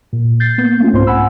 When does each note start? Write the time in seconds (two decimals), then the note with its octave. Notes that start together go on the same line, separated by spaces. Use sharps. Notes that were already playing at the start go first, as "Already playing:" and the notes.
0.13 A#2
0.40 G6 A6 C7
0.58 A#3 B3 G6
0.80 A3 C#4 F4
0.92 C2 G#2 C4 F4 C5 C6
1.07 F#5 G#5 B5 E6